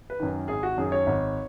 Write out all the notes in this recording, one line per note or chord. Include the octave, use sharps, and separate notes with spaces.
B4
F#2 D#3
G#1 G#4
F#4
F#2 D#3 G#4
C#5
G#1